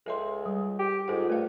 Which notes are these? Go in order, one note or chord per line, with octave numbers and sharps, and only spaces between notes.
C#2 A4 E5 C6
G3
G4
G#2 F4 A4 F#5
G2 A3 F5